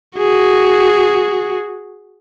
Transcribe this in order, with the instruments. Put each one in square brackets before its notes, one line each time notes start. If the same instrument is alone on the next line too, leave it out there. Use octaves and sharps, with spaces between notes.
[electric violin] F#4 G#4